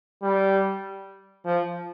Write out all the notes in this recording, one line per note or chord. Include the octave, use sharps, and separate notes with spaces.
G3
F3